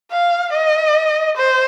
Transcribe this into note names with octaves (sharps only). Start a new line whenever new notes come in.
F5
D#5
C5